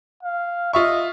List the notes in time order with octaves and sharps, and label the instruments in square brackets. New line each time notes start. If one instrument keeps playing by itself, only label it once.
[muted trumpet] F5
[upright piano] F4 E5 C#6 [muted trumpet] D#5